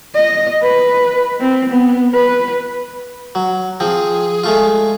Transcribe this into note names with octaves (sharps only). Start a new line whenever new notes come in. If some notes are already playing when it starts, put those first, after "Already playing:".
D#5
B4
C4
B3
B4
F#3
F3 C4 G#4
G#3 A3 F4